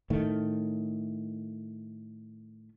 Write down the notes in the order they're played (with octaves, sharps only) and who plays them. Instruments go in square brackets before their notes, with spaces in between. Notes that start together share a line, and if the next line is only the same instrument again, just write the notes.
[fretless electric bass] A2 D#3 A3